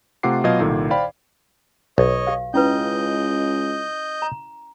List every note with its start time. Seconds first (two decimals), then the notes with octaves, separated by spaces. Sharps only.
0.23 C3 A3 F4 F#5 D6 C7
0.44 B2 F#3 F4 D#5 F5 G#6
0.60 C2 A#2 D#3 A4
0.90 C5 D5 F5 G5 B5
1.98 B1 C#5 D#5
2.27 G4 F5
2.54 C#2 C#4 E4 B4 D#5 G6
4.22 A#5